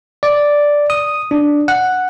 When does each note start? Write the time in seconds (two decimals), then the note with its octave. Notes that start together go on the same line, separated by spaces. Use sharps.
0.23 D5
0.90 D#6
1.31 D4
1.68 F#5